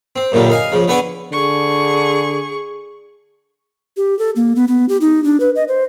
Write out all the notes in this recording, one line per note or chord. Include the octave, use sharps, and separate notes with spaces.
C4
F#2 A#2 D3 G3
D#4 F5 G#5
C#3 F3
D3 B3 B4 G#5 C#6 D6
D3 G#4 C#6
G4
A4
A#3
B3
B3
G4
D#4
D4
B4
D#5
C5